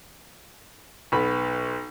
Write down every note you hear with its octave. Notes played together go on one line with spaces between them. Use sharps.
B1 B3 B5